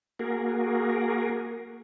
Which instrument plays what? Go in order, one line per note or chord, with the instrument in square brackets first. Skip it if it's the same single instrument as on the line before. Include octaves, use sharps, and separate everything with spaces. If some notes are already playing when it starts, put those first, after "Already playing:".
[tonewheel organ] A#3 F#4 G#4 A#4